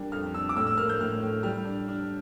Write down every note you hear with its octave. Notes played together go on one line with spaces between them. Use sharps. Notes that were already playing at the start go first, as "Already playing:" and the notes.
Already playing: G3 A#3 D4
F2 F6
D4 E6
D6
A2 E6
E6
A#3 F6
G6
A2 F6
A2
G3 F6
D4
D4